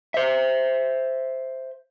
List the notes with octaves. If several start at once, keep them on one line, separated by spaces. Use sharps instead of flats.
C5 E5